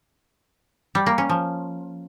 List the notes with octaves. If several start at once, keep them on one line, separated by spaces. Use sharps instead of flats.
G3
A#3
C#4
F3